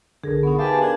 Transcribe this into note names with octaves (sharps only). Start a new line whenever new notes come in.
B1 D3 G#4 A#4
B3 D#4 F#4
G4 G#4 B4 E5 F5 G#5 A5
D4 A#4 F5 A5 G#6